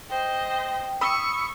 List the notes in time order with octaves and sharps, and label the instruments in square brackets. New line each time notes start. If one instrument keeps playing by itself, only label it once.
[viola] C5 D#5 [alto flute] G5
[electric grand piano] B5 D#6 E6 [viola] C#6